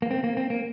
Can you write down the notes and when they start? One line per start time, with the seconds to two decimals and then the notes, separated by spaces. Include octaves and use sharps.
0.02 A#3
0.11 C4
0.24 A#3
0.37 C4
0.50 A#3